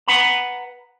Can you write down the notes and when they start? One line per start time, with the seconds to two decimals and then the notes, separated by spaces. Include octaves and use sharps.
0.08 B4 F#5 A#5 B5